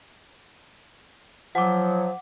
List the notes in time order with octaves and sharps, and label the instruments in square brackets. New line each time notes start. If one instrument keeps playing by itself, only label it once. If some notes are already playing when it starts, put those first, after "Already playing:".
[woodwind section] F3 F#3 [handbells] F#5 D6